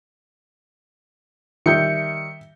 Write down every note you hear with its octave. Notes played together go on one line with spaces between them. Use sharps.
D#3 G3 E5 G6 C#7